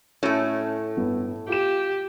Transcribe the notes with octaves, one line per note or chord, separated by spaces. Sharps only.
A2 A3 C#4
G1 B3
F4 G4 E7